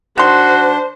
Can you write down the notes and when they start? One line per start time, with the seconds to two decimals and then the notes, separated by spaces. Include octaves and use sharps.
0.18 D#3 D4 F#4 C5 C6